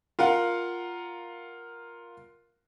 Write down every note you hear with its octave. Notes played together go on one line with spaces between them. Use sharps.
F4 A#4 F5 F#5